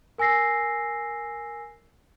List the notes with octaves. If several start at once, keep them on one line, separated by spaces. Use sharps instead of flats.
A#4 G#5 E6 A#6 C7